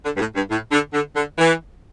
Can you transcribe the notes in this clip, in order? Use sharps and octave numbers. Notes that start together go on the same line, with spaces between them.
D3
G2
A2
G2
A2
D3
D3
D3
E3